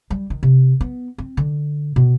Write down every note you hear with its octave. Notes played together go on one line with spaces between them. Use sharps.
G3
D#3
C3
B3
C4
D3
B2